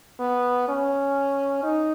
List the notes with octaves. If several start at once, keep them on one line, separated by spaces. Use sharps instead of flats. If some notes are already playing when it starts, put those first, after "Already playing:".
B3
C#4
D#4